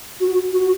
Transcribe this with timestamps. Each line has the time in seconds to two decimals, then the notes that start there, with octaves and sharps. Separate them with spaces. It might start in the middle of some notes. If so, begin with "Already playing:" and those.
0.20 F#4
0.53 F#4